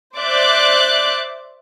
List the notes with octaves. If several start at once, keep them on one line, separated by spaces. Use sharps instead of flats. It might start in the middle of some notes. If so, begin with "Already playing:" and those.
C5 D5 E5 D6 F#6 G6